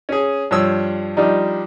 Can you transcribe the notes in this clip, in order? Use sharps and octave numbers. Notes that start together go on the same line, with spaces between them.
C#4 G#4
G2 F3 C#5 E6
F3 G3 D4 D#4